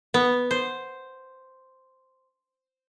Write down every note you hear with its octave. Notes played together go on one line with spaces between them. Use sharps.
B3
C5